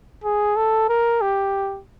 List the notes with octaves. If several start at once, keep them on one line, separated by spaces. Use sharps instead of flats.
G#4
A4
A#4
G4